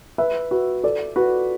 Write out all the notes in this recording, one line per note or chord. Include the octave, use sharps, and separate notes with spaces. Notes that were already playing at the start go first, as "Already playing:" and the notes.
B4 E5
F#4 B4
A4 D5
F#4 B4